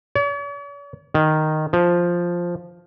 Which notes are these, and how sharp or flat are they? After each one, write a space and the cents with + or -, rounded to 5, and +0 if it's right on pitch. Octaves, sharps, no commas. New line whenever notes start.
C#5 +45
D#3 -5
F3 +0